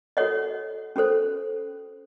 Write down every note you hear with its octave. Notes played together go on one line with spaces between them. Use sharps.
F#4 A4 C#5 D#5 F#5
C#4 F#4 A4 C5